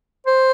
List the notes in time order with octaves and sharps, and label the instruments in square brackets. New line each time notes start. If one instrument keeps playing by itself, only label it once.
[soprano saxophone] C5